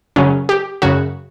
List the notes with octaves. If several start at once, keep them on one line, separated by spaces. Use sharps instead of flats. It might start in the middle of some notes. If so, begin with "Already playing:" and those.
F#2 C#3 F#3 C#4
G4
F#2 C#3 F#3 F#4